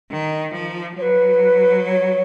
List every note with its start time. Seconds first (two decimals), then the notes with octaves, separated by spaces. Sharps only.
0.11 D#3
0.54 F3
0.97 F#3 C#5
1.02 B4
1.85 C#5